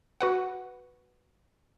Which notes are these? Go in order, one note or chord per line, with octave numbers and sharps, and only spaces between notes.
F#4 B4 F#5